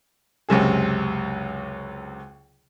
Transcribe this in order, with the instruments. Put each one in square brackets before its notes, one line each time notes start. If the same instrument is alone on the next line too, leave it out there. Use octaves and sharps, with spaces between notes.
[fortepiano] C#2 F#2 C3 G#4